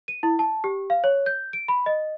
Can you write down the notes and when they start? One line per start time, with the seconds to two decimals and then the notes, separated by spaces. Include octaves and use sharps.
0.08 D#7
0.23 E4
0.39 A5
0.64 G4
0.90 F5
1.04 C#5
1.26 G6
1.53 D7
1.68 B5
1.86 D#5